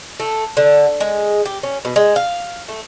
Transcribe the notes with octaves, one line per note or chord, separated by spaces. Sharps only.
A3
D3
G#3
G4
C#4
B2
G#3
F5
A3